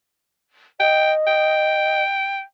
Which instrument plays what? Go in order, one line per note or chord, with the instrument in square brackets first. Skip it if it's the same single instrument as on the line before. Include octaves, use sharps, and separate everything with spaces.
[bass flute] D#5 [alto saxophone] G5
[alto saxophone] G5